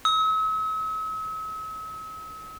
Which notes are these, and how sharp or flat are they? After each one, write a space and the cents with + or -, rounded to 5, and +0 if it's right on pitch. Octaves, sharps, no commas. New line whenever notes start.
E6 -45